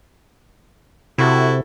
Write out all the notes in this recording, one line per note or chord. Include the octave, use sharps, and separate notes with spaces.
C3 E4 F#4 A4